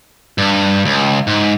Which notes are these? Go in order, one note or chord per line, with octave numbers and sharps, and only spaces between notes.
G2
C#2
G#2